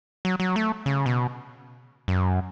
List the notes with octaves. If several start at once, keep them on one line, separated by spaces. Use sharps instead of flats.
F#3
F#3
A3
C#3
B2
F#2